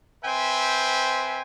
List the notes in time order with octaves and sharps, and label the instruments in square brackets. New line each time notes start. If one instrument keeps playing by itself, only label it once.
[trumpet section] C4 B4 C5 E5 G5 G#5